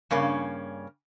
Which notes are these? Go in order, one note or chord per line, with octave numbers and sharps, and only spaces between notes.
G2 C#3 A#3 C#4